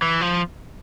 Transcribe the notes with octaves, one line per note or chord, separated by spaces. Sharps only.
E3
F3